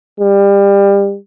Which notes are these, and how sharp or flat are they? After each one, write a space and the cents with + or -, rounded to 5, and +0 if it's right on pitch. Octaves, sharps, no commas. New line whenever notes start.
G3 +25